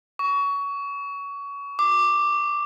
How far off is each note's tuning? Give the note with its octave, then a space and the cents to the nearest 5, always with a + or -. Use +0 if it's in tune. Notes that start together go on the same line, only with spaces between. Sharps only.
C#6 +25
D6 +5